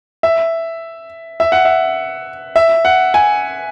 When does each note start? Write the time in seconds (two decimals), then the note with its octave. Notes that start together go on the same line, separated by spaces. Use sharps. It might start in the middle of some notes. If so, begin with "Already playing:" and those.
0.23 E5
1.40 E5
1.52 F#5
1.65 E5
2.56 E5
2.85 F#5
3.14 G#5